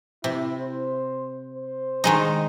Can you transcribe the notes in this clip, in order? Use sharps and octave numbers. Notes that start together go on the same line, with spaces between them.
C3 E4
C5
C5
D#3 G#3 D#4